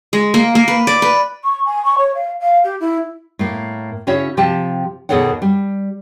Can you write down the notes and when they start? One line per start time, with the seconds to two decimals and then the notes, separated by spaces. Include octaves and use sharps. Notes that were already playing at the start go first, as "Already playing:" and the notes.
0.13 G#3
0.34 A#3
0.55 A#3
0.68 B4
0.87 D5
1.02 B4
1.44 C#6
1.65 G#5
1.84 C#6
1.98 C#5
2.15 F5
2.40 F5
2.64 G4
2.80 E4
3.39 A2 A#3
4.07 C#3 C#4 E4 F#4 C#5 E5
4.37 C3 F3 G4 G5 A5
5.09 D#2 B2 G#4 A4 C#5 F#5
5.42 G3